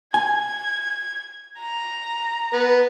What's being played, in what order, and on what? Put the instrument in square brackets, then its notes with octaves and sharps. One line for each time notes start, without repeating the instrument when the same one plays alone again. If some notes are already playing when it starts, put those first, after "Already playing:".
[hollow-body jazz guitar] G#5 [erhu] G#6
[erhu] A#5
[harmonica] B3